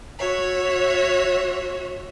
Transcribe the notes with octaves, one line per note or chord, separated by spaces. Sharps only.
F#4 C#5 E5